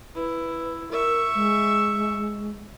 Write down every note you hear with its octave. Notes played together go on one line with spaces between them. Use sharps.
E4 B4
A#4 E5 C#6
G#3